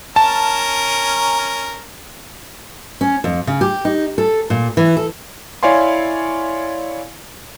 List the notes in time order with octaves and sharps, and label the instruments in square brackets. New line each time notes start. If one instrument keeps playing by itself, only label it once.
[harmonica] C#4 A#4 [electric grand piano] A5
[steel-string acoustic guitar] C#4
F2
C#3
G4
D#4
A4
A#2
E3
A4
[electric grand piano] E4 C#5 D5 F5 G#5 C6